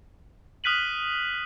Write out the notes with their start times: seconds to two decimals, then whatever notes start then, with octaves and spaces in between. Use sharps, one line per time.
0.64 D#6 F6 F#6 B6 D#7 F#7